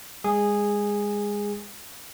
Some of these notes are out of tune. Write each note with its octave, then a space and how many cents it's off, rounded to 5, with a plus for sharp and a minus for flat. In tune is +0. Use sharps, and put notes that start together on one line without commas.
G#3 -25 G#4 -10